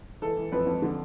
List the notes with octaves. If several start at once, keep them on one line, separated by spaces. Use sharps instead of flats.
E3 A4
E3
F2 B4
F2
D3